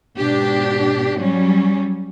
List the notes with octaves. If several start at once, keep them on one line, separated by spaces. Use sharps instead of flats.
G#2 B2 D4 G4
F#3 G3 C#4